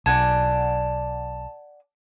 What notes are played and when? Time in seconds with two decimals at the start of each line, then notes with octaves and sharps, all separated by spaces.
0.06 B1 D5 F#5 G#5 A5